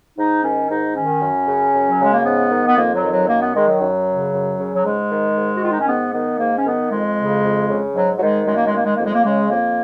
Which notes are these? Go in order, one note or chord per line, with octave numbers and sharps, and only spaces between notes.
G#2 D#4
D#3 C#4
G#2 D#4
D#3 C#4
F#2
C#3
F#2
F#3
C#3 G#3
A#3
G#2 B3
D#3
B3
F2 A#3
F#3
D#3
F#3
F#2 A#3
B3
D#3 G#3
F#3
F#2
C#3
F#2
C#3
F#3
G#2 G#3
D#3
G#2
F#4
D#3 F4
D#4
C#4
G#2 B3
D#3 B3
G#2 A#3
C#4
D#3 B3
F2 G#3
C#3
F2
C#3
G#2 F#3
F#3
D#3 G#3
F#2 G#3
A#3
G#3
D#3 A#3
G#3
F2 A#3
G#3
A#3
C#3 G#3
F2 A#3